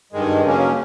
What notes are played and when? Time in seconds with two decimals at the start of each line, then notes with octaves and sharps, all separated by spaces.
0.13 G2 D#3 G#3
0.42 C#3 F#3 A#3 C#4